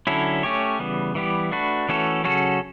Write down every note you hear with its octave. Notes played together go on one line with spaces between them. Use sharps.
D3 F#3 C#4 E4 A4
A3 C#4 G4 C#5
C#3 E3 G3 B3
E3 G3 B3 E4 G4
A3 D4 F#4 B4
E3 A3 C#4 F#4 A4
C#3 F#3 C#4 F#4 A4